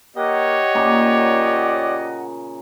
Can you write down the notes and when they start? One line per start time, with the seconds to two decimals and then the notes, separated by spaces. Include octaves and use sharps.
0.16 A#3 G4 C#5 D#5 F#5
0.75 A#2 C#3 A#3 D5